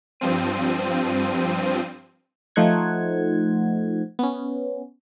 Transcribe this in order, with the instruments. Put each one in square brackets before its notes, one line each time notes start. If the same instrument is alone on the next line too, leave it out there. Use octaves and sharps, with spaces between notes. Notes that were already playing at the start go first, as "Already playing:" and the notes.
[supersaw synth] G2 F3 C4 D#7
[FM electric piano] F3 A3 D#4 C5 F#5 G#6
B3 C#4